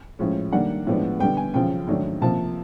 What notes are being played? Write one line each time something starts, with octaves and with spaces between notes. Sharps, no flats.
A2 F3 G#3 C#4
D#3 G3 A#3 D4 F#5
A2 F3 G#3 B3 D4
D3 G3 B3 G5
G#5
F#2 C#3 F3 G5
G#2 D#3 F#3 A3 D4
C3 F3 A#3 A5